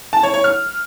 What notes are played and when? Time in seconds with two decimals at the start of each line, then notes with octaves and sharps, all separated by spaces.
0.13 A5
0.23 C#5
0.34 C#5
0.44 F6